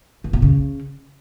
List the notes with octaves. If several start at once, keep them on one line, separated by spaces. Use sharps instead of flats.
C#3
B2
C#3